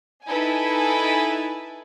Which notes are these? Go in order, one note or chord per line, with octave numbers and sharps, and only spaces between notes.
D#4 E4 A4 B4 G#5